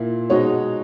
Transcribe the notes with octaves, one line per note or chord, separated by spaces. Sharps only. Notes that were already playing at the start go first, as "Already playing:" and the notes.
Already playing: A#2 A#3 E4
B2 G#3 D#4 F#4 C#5